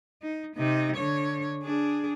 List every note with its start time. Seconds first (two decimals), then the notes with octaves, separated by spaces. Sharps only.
0.22 D#4
0.56 C3 D#4
0.96 D3 C#5
1.63 D4 G#4